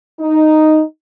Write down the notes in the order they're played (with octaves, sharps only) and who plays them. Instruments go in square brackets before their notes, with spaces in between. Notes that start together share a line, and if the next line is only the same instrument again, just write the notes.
[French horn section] D#4